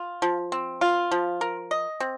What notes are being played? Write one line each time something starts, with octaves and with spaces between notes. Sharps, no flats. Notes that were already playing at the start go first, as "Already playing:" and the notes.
Already playing: F4
F3
C4
F4
F3
A#4
D#5
C4